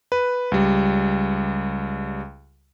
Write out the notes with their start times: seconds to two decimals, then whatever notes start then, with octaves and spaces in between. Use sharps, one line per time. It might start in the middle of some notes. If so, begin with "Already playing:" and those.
0.12 B4
0.52 C#2 G3